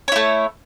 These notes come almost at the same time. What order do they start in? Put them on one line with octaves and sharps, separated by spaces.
C#5 E4 A3